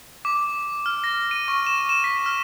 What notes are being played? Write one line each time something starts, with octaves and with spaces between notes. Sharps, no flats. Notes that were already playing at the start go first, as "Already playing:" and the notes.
D6
F6
A#6
D#7
C#6
E7
E7
B6
F6